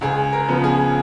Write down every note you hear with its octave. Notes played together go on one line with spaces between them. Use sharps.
C#2 G#4
A#4
C#3 F3 B3
G#4